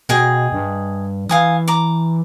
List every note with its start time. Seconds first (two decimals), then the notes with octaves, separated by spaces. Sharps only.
0.09 B2 G#4 D#5 G5
0.52 G2
1.29 E3 F5 G#5 D#6
1.68 A#5 D6